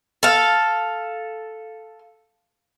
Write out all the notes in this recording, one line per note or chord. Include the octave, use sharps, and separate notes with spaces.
A4 F5